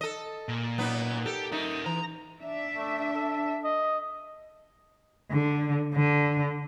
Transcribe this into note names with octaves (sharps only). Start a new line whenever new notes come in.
A4 D#5
A#2
F#2 B3 D#4
G4 A4
D#4 A#4 E5
E3 A#5
D4 E5
A3
A4
D#5
D3
D3